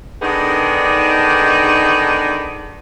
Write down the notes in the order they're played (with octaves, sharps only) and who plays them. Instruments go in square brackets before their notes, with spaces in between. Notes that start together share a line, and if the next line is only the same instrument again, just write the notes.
[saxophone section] D3 D#3 B3 D4 D#4 G#4